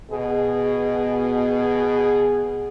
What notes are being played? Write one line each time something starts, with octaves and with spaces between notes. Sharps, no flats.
B2 G#4